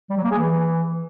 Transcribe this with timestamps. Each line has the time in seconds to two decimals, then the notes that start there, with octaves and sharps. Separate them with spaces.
0.10 G3
0.17 F#3
0.24 A#3
0.31 G#4
0.39 E3